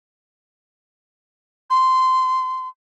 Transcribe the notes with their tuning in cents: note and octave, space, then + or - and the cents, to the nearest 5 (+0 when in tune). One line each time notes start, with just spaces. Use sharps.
C6 -15